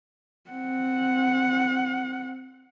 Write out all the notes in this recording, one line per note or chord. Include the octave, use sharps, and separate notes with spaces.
C4 F#5